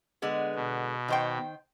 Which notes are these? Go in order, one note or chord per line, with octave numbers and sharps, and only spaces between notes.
D3 G#3 B3
B2
D#3 C5 G5